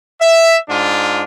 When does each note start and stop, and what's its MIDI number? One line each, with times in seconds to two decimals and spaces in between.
0.21 0.57 76
0.70 1.24 44
0.70 1.24 62
0.70 1.24 65